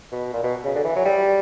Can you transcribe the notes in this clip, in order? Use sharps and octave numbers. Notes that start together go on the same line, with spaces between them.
B2
A#2
B2
C#3
D3
E3
F#3
G3